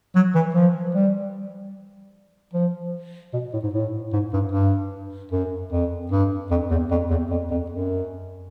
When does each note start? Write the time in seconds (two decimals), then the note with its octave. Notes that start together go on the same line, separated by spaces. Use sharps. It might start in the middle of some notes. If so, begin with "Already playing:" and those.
0.15 F#3
0.35 E3
0.55 F3
0.95 G3
2.53 F3
3.34 B2
3.53 A2
3.63 G#2
3.73 A2
4.13 G#2
4.33 G2
4.52 G2
5.32 F#2
5.72 F2
6.12 G2
6.51 F2
6.71 E2
6.91 F2
7.10 E2
7.31 F2
7.51 F2
7.70 F#2